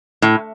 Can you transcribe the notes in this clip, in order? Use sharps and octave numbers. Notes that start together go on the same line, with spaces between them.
A2